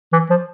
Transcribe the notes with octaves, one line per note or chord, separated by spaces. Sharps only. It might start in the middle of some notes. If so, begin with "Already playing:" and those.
E3
F3